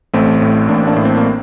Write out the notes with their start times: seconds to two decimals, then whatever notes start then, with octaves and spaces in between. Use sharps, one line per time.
0.13 A1 A3 C4
0.42 A2
0.68 A1 A#3 D4
0.87 A#3 D4
0.96 A2
1.05 C4
1.17 A#3